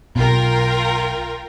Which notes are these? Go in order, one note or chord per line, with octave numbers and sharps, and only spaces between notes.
B1 B2 F4 A#4 G5